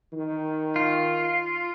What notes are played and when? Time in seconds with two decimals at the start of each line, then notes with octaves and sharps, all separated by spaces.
0.13 D#3
0.76 F4